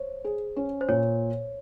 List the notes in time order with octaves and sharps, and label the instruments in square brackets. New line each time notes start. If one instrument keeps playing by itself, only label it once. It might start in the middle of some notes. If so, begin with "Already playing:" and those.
Already playing: [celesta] C5 [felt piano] C#5
[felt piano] G#4
C#4
[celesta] C5
[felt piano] A#2 [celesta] C#5